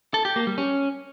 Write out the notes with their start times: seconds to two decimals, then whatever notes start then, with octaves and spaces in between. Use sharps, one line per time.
0.14 A4
0.25 G4
0.36 A#3
0.47 G3
0.58 C#4